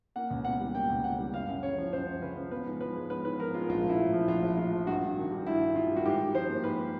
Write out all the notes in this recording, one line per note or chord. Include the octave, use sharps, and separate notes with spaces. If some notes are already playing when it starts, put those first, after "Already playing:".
A#3 F#5
C#2
B2 F#5
G3
A#3 G5
C#2
B2 F#5
G3
F#2 F5
F#2
C#3 C#5
F3
F#2 C5
F#2
C#3 B4
F3
B3 B4
G#2
F3 B4
G#3
B3 B4
G#2 B4
F3 A#4
G#3 F4
A#1 F4
A#1
E4
A2
F3
A#1 F4
A#1
A2 F4
F3
G2 F#4
G2
D#3
G3
G2 E4
G2
D#3 F4
G3
F#4
G#2 G4
G#2
F3 C5
A#3
G#2 B4